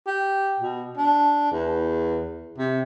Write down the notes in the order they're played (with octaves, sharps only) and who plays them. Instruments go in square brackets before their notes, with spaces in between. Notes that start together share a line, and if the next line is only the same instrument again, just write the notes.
[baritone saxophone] G4
B2
D4
E2
C3